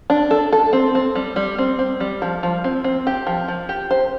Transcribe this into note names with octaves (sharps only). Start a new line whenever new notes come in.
D4
A4
A4
C4
C4
G3
G3
C4
C4
G3
F3
F3
C4
C4
G4
F3
F3
G4
C5